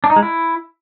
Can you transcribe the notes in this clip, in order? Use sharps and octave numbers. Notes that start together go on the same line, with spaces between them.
D4
D#4
G#3
E4